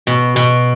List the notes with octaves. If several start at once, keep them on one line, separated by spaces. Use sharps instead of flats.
B2
B2